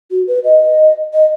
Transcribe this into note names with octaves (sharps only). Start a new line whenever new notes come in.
F#4
B4
D#5
D#5